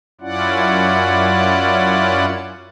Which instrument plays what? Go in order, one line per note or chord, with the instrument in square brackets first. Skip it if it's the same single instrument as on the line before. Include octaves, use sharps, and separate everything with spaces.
[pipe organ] F#2 C#4 E4 F4 D5 F#5